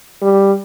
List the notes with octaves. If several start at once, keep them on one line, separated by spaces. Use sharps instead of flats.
G3